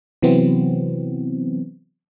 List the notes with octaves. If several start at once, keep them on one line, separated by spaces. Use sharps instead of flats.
C3 E3 F#3 B3 C4